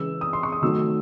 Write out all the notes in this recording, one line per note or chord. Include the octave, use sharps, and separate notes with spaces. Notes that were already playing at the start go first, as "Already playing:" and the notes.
Already playing: C#3 E3 G#3 E6
D#6
C6
C#6
D#6
D#3 F#3 A3 E6